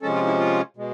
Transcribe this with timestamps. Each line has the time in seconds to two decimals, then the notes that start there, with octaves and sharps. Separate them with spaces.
0.02 C3 F3 G#3 C#4 A4
0.15 F4
0.27 E4
0.39 F4
0.77 B2 G#3